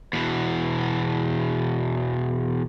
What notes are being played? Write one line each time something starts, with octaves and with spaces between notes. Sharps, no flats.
E2 B2